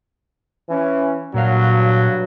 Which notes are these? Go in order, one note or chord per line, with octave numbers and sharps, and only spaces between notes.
E3 C#4
G2 A#2 F#3 F5